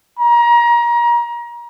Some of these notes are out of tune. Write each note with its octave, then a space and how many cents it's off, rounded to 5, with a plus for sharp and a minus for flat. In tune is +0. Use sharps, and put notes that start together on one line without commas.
A#5 +30